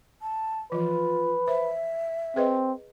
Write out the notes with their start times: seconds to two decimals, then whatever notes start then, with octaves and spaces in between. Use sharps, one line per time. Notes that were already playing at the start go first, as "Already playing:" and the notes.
0.22 A5
0.72 E3 F3 F4 B4
1.48 C5 E5
2.36 C4 G#4 B4 D#5